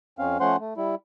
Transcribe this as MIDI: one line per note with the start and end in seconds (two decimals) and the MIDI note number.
0.19 0.37 41
0.19 0.37 60
0.19 0.37 61
0.19 0.37 77
0.40 0.57 53
0.40 0.57 57
0.40 0.57 61
0.40 0.57 72
0.40 0.57 78
0.40 0.57 84
0.60 0.74 57
0.77 0.95 55
0.77 0.95 64